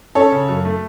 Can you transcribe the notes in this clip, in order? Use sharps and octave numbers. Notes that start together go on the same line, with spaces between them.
C#4 A4 C#5
C#3
F#2
A3